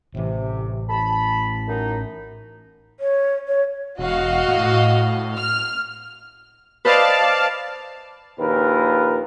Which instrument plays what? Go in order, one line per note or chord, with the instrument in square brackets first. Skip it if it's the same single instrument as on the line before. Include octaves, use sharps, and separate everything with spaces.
[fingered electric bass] A1 E3 [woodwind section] C3
[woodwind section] A5 B5
F#2 D#4
[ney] C#5
C#5
[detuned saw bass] E1 [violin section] F#4 D#5 F5
[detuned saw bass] A2
[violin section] F6
[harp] B4 C5 D#5 [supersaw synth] D5 F5 A5
[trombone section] A#1 D#2 A#2 A#4 B4